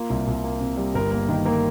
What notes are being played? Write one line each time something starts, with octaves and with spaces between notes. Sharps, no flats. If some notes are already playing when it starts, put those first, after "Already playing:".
Already playing: A#3 F4
C2
C2
A#3
C3
G3
G1 A#4
A#3
D#3
A#3 A#4